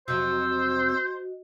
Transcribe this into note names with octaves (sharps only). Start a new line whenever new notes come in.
F2 C3 F#3 F#4 C5 D#5 E6